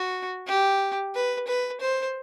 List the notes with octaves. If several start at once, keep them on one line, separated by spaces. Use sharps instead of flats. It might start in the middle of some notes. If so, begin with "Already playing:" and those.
Already playing: F#4
G4
B4
B4
C5